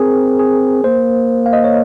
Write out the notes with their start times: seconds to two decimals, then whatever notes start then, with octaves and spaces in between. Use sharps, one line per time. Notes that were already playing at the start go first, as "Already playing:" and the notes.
Already playing: C4 G#4 A#4
0.39 G#4
0.84 A#3 C5
1.46 F5
1.53 D#5
1.64 C#5